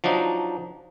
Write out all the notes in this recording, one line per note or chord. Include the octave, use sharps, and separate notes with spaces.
F3 F#3 D4 D#4